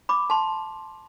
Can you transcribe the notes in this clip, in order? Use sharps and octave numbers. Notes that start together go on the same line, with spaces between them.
B5 D6
A5 C6